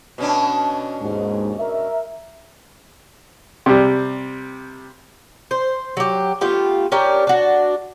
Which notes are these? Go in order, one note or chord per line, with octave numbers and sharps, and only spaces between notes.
B2 C#4 D4
D#2 G#2
A#4 E5
C3 G3
C5
F#3 G4
A3 B3 F4 G4
C#4 D4 G4 A#4
D4 F#4